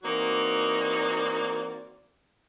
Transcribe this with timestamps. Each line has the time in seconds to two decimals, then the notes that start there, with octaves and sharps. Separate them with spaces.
0.03 E3 A#3 C4 D#4 F#4 D5